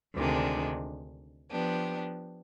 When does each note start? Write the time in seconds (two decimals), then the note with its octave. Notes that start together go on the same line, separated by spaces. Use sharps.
0.15 D2 C3 D#3 G#3 D4
1.50 F3 B3 D4 G4